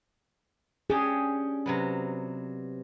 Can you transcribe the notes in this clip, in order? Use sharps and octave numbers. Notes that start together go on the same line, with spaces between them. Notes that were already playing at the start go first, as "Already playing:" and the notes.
C#4 D4 G4 G#4
C3 F#3 B3